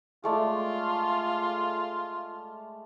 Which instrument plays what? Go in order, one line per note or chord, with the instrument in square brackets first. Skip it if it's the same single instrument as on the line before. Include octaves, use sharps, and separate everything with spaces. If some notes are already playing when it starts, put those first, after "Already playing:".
[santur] G#3 A3 D5 [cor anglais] F4